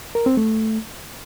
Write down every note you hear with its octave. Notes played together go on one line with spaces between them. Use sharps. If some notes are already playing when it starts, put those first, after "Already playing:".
A#4
C4
A3